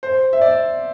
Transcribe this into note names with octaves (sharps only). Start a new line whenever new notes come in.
C5
E5
D5